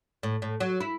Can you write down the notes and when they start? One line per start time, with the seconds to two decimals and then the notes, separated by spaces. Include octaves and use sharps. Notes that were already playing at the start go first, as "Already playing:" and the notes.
0.23 A2
0.42 A2
0.60 F#3
0.80 E4